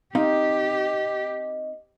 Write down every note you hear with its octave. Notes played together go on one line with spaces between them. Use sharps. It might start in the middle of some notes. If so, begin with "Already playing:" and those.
C4 D#4 G4 D#5 F5